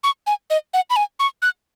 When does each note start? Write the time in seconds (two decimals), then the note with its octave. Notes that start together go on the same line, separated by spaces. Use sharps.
0.04 C#6
0.27 G#5
0.50 D#5
0.74 F#5
0.90 B5
0.96 G#5
1.20 C#6
1.42 F#6